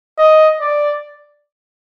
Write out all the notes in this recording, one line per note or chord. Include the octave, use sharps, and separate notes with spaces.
D#5
D5